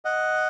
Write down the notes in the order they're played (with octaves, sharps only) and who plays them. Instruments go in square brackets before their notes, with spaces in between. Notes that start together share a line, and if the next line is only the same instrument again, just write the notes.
[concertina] D#5 F#5